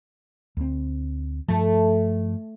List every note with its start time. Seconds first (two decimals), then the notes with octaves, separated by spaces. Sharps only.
0.57 D2 C4
1.48 G2 F3 A3